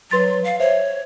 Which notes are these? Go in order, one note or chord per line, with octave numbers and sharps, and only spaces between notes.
F#3 B4 C6 A6
F5
C5 C#5 E5